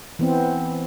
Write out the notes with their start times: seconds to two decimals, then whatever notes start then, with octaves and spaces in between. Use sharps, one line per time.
0.19 E3 B3 C4